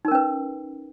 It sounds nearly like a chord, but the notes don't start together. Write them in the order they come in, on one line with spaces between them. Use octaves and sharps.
D#4 A#4 C#4 B4